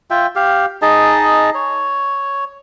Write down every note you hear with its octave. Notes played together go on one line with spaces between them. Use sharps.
F4 E5 G5
G4 F5
D#4 G#4 D#5 A5
C#5